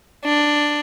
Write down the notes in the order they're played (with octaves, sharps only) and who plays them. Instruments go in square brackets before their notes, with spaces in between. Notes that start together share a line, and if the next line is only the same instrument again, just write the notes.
[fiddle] D4